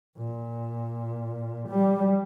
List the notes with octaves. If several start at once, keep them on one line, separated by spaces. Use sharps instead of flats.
A#2
G3